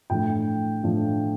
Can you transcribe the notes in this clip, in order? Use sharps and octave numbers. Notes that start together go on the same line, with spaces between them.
A2 F3 A3 D4 G5
A2 F3 A3 D4